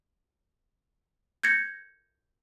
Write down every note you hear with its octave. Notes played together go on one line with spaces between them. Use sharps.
G6 G#6 A#6 C#7